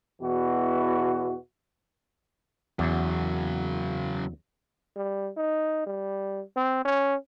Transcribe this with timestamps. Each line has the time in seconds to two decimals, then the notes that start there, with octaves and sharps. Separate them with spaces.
0.22 E2 B2 E3 F#4
2.79 E2 C#3 F#3
4.96 G3
5.37 D#4
5.86 G3
6.56 C4
6.85 C#4